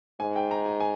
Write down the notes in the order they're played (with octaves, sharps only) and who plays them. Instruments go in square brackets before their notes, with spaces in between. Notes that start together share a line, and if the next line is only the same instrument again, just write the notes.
[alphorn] G#2 [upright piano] G#5
[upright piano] G5
A#5
G#5
G#5